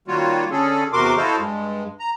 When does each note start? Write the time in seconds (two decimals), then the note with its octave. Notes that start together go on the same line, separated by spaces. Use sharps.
0.08 D#3 G3 A#3 F4 F#4 C#5
0.51 D3 C#4 G#4 A4
0.93 E2 C3 F#4 A#4 C6 D6
1.17 E4 F#4 A4 C5 D#5 F5
1.39 G2 G#3
2.00 A#5